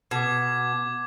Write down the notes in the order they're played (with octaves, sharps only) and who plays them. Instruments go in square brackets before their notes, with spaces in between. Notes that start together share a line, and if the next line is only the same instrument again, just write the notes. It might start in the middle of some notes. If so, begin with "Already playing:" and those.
[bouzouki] B2 [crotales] D6 G#6